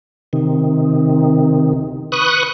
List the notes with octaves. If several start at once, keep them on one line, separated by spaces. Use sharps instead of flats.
C3 D#3
B4 C#6 D#6 F#6